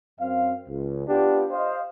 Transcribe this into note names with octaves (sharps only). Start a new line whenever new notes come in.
F#2 C4 F5
C#2
B3 D4 F4 G4
C5 D#5 F5